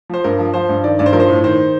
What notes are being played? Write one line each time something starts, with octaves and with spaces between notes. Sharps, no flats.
F3 C5
G2 A#4
F3
F3 C5
G2
D#3 D5
G2 D5
C5
F3 A#4
C5
A2
D#3 C5